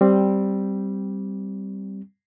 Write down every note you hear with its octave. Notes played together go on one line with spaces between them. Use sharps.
G3 C4